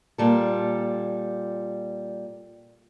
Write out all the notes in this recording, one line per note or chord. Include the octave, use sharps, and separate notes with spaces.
A#2 G3 A4